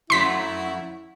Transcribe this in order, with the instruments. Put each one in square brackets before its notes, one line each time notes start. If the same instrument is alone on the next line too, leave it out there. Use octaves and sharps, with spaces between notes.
[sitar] F2 F#3 A3 [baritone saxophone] E4 [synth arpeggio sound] C6 B6